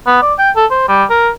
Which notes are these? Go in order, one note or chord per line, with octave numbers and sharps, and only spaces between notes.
B3
D5
G5
A4
C5
G3
A#4